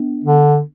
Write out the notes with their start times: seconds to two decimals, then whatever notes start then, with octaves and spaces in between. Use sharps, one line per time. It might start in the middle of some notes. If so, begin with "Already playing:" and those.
Already playing: B3 D4
0.24 D3